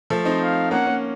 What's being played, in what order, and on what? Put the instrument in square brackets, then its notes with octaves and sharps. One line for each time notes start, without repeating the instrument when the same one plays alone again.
[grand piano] F3 A3
C4 D#4
[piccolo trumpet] F5
[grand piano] A#3 C#4 [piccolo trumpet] F#5
[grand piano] A#3 C#4